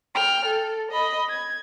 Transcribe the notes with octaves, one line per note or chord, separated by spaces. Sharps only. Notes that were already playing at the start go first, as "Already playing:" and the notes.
G5 F6
A4
D#5 B5
G#6